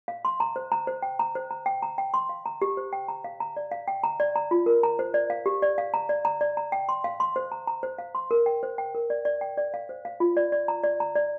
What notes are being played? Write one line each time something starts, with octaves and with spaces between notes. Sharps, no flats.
F5
C6
A#5
C5
A#5
C5
G5
A#5
C5
A#5
G5
A#5
G5
C6
F5
A#5
G4
C5
G5
A#5
F5
A#5
D5
F5
G5
A#5
D5
A#5
F4
A#4
A#5
C5
D5
F5
G4
D5
F5
A#5
D5
A#5
D5
A#5
G5
C6
F5
C6
C5
A#5
A#5
C5
F5
C6
A#4
G5
C5
G5
A#4
D5
D5
G5
D5
F5
C5
F5
F4
D5
D5
A#5
D5
A#5
D5